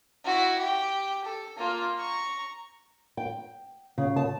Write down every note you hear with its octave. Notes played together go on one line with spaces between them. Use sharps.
E4 F#4
G4
A4
A#3 F4
A#5 C#6
G5
C#3
A5